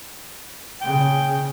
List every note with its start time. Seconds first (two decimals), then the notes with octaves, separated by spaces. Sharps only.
0.81 A#2 C#3 G5